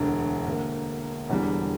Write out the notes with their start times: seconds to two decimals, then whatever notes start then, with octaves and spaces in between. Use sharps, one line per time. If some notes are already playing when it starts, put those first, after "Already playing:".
Already playing: E1 D2 D3
0.46 D2 D3 A#3
1.30 E1 E2 D3 G3